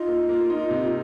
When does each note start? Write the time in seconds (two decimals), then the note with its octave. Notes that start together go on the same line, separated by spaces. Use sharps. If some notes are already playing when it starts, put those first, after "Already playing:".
Already playing: D#4 F4
0.08 A#3
0.29 A#3
0.50 D#4
0.71 C3